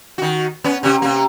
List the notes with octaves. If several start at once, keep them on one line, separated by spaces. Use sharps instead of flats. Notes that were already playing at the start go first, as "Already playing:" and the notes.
D#3 F#4
B3 C#4
C3 C#4 G4
C3 A#3